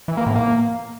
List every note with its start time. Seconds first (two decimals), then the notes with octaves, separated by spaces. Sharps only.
0.08 E3
0.17 A#3
0.26 A2
0.36 A#3